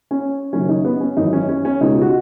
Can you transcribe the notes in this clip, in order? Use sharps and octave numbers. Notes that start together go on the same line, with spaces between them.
C#4
F#1 F#2 D#3 F#3 C#4
D#4
B3
C#4
G#1 F#2 E3 D#4
C#4
C#4
C#4
C#2 B2 G#3 D#4
F#4